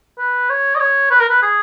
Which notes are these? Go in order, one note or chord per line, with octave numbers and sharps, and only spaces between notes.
B4
C#5
D#5
C#5
B4
A#4
B4
G#4